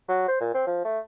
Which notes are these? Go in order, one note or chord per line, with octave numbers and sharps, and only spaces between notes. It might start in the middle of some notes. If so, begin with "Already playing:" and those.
F#3
C5
A#2
C4
F3
A3